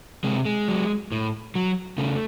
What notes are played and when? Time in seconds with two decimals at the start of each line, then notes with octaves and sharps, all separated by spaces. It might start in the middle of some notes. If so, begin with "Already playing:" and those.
0.24 C3 G#3
0.45 G#3
0.68 F#3
1.12 A2
1.55 F#3
1.98 C#3 A3